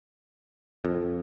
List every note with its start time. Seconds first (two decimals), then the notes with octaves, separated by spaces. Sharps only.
0.85 F2